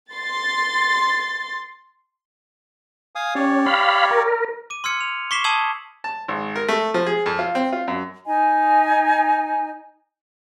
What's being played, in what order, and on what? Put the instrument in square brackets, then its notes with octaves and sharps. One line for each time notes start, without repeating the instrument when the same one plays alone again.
[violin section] C6 A6
[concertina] F5 G#5 D#6
[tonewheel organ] C#4 [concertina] G4 C#5 D5
[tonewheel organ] F5 B5
A#4
[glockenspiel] D6 D#7
C6 E6 F6 G#6 C#7
F7
C#6 D6 B6 C7 E7 G7
A5 C#6 D#6 E6 G#6 F#7
[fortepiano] A5
G#1
A#4
A3
F3
G#4
F2
F4
C4
F4
F#2
[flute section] D#4 D#5 G#5